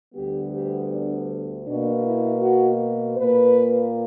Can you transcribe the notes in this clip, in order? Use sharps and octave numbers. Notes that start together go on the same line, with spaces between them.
D2 D3 G3 B3 G4
G4
D4
B2 A#3 D4
E4
F#4
A#2 A#3 B4